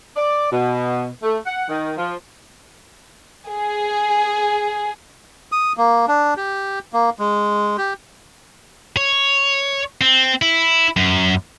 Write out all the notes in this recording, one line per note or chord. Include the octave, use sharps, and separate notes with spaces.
D5
B2
A3
F#5
D#3
F3
G#4
D#6
A#3
D4
G4
A#3
G#3
G4
C#5
C4
E4
F#2